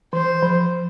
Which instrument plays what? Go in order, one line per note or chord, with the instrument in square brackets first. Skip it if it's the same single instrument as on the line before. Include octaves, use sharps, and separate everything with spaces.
[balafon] E3 [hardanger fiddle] C5
[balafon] F3